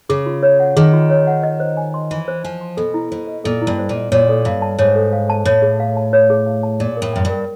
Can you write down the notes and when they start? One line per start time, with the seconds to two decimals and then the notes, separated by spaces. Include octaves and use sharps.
0.09 C#3 G#4
0.26 F4
0.43 C#5
0.60 F#5
0.77 D#3 G#4
0.93 F4
1.10 C#5
1.27 F#5
1.43 D#5
1.60 C5
1.77 G#5
1.94 C6
2.11 E3 D#5
2.28 C5
2.44 F3 G#5
2.61 C6
2.77 B2 A4
2.94 E4
3.11 B2 C5
3.27 D#5
3.44 A#2 A4
3.62 E4
3.67 G2
3.79 C5
3.89 A#2
3.95 D#5
4.12 A#2 C#5
4.29 A4
4.45 G2 F5
4.62 A5
4.78 G#2 C#5
4.95 A4
5.13 F5
5.30 A5
5.45 A2 C#5
5.62 G#4
5.80 F5
5.97 A5
6.13 C#5
6.30 G#4
6.46 F5
6.63 A5
6.80 A#2 D5
6.97 A#4
7.02 A2
7.13 F#2 G5
7.25 G2 A#4